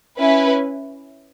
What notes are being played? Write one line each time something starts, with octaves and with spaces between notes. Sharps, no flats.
C#4 E4 B4